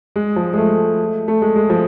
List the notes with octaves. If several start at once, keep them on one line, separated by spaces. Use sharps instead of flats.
G#3
F3
G#3
A3
A3
G#3
G#3
F3